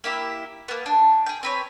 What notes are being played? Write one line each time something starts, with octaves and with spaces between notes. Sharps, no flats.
A#3 E4 G4 E5
A#3 B3
D4
G#4 G5
C4 B4 C#5